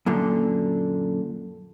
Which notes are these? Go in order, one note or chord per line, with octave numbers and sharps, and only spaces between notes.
F#2 A#2 D3